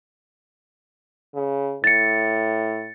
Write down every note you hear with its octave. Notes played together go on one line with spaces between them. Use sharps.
C#3
A2 A6 C#7